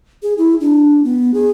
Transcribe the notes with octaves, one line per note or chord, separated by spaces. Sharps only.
G#4
E4
D4
B3
G#4